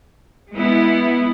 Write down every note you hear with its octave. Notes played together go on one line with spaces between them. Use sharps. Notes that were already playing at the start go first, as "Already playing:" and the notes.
G#3 B3 E4